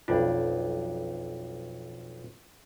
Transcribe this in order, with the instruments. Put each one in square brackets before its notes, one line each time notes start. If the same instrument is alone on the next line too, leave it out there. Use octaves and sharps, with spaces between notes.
[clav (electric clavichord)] B1 F2 D4 [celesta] F4